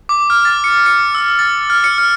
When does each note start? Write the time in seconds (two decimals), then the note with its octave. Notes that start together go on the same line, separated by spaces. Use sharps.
0.09 D6
0.30 F6
0.45 A6
0.64 C#7
0.86 C#7
1.15 E6
1.39 A6
1.70 F6
1.84 C#7
1.98 F6